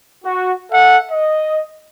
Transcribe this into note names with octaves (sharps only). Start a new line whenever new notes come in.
F#4
A4 E5 F#5
D#5